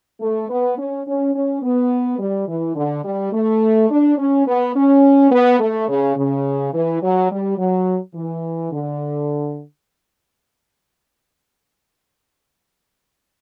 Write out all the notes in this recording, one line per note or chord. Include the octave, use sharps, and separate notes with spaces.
A3
B3
C#4
C#4
C#4
B3
G3
E3
D3
G3
A3
D4
C#4
B3
C#4
B3
A3
C#3
C#3
E3
F#3
G3
F#3
E3
D3